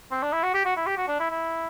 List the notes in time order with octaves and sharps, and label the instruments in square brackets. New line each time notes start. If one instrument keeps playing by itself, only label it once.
[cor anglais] C4
D4
E4
F#4
G4
F#4
E4
G4
F#4
D4
E4
E4